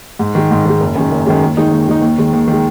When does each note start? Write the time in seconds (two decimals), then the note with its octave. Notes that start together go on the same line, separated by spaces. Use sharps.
0.19 G#2
0.35 D#3 G#3
0.51 G#2
0.66 D#3 G#3
0.80 F#1
0.95 F#2 D#3 G#3
1.12 F#1
1.26 F#2 D#3 G#3
1.42 D#2
1.57 D#3 G#3 D#4
1.72 D#2
1.88 D#3 G#3 D#4
2.02 D#2
2.18 D#3 G#3
2.33 D#2
2.48 D#3
2.53 G#3